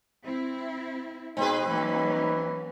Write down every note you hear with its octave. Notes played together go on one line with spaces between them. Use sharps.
C4 E4
B2 C4 D#4 G#4 B4
E3 F#3 A#3 C#4 D#4